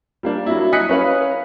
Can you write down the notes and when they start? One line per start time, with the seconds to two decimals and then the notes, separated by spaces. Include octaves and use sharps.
0.23 G3 A#3 D4
0.46 F#3 E4
0.72 D#5 G#5 D#6 F#6 B6 C#7
0.89 C#4 B4 F5